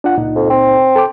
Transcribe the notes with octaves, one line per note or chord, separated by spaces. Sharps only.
D4 F4 F#5
C#2 A#2 D#4
F2
C4
A4 G5 D6